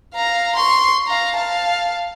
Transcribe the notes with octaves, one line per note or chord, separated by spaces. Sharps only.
F5 A#5
C6 C#6
F5 A#5
F5 A5